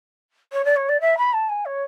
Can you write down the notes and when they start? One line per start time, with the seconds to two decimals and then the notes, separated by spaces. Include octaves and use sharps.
0.52 C#5
0.64 D5
0.76 C#5
0.88 D5
1.00 E5
1.17 B5
1.33 A5
1.49 G#5
1.65 C#5